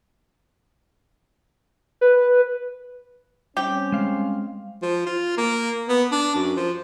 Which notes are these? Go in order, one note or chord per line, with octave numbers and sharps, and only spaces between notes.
B4
G3 C4 C#4 G4
G#3 F5
F3
F4
A#3
B3
D4
F#2
F3